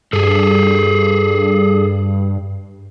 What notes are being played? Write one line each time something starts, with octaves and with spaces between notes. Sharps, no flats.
G2 G#4 A4